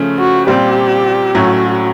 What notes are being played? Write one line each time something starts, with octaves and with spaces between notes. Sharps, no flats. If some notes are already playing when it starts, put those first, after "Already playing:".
Already playing: C#3 F3 A3 C#4
F#4
A#2 G3 C4 F4 G4
A2 F#3 A3 C#4 F#4